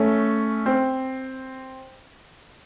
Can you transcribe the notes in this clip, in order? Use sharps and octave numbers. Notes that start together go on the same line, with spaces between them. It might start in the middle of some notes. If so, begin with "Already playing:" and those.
Already playing: A3 C#4
C4